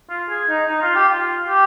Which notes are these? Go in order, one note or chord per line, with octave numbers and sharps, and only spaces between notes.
F4
G#4
D#4
D#4
F4
G4
F4
G4